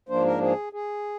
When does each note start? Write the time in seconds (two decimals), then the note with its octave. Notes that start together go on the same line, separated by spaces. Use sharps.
0.09 G#2 F3 A#3 D4 C5
0.25 A#4
0.41 G#4
0.73 G#4